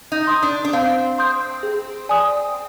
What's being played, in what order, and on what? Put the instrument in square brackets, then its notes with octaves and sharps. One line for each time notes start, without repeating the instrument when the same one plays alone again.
[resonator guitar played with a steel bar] D#4
[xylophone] C6 D#6 G6
[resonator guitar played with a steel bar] D4
D4
[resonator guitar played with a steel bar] C4 [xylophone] F5
[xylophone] C6 D#6 G6
G#4
D5 G#5 D#6